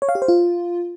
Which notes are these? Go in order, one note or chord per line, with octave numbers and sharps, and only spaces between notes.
C#5
F5
G4
C5
F4